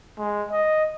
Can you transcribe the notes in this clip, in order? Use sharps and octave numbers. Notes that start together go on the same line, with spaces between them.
G#3
D#5